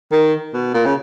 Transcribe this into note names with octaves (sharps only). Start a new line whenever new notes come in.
D#3
B2
A#2
C#3